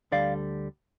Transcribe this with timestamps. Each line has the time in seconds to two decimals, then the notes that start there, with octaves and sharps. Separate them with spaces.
0.12 D2 D3 G3 D5 F5